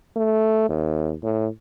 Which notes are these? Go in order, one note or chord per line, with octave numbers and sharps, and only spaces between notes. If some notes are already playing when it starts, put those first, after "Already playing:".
A3
D#2
A2